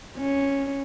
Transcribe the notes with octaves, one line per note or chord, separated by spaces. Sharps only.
C#4